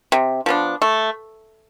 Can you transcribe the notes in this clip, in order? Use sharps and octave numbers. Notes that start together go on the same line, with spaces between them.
C3
F3 B3 D4
A3